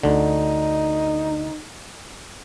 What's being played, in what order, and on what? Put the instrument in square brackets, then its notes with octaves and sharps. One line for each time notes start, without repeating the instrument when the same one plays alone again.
[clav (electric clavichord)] D2 D3 [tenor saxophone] D#4